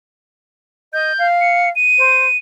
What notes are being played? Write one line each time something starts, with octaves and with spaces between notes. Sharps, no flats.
D#5 G6
F5
C#7
D#7
C5